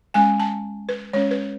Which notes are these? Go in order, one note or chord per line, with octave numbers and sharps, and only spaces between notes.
G#3 C#4 G#5
A5
B4
G#3 C#4 C#5
B4